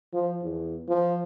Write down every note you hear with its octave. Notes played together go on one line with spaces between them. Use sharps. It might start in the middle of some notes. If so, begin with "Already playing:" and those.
F3
E2
F3